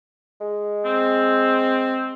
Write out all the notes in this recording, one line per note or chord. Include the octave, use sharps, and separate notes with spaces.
G#3
C4